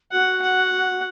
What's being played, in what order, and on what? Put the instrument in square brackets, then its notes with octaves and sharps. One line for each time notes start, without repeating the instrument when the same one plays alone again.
[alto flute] F#4 [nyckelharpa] F#5
[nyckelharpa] F#5